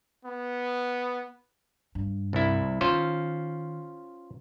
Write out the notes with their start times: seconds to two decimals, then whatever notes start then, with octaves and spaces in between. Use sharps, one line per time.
0.25 B3
1.95 G2
2.33 C2 E4
2.81 D#3 C#4 F4 C5